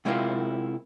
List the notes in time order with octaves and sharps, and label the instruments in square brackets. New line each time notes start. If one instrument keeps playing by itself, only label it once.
[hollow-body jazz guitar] C3 G#3 C4 E4 F4 A#4